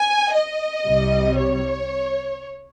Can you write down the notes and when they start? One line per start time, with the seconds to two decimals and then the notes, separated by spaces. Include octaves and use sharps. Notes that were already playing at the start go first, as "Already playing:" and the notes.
Already playing: G#5
0.35 D#5
0.87 C2 C3 G3
1.39 C#5